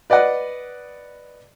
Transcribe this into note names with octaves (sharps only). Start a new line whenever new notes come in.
B4 D5 D#5 F#5